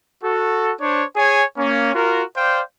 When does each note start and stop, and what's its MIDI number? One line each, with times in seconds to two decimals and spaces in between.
0.23 0.72 66
0.23 0.72 69
0.81 1.04 62
0.81 1.04 72
0.81 1.04 73
1.16 1.44 68
1.16 1.44 73
1.16 1.44 80
1.58 1.92 58
1.58 1.92 61
1.95 2.23 65
1.95 2.23 66
1.95 2.23 70
2.36 2.61 72
2.36 2.61 74
2.36 2.61 77
2.36 2.61 79